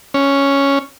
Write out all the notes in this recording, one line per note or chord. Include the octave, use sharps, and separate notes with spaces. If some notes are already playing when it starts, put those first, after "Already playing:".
C#4